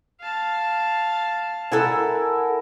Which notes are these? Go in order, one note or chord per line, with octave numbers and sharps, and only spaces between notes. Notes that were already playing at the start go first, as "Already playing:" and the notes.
F5 A5
E4 A4 A#4 F#5 G#5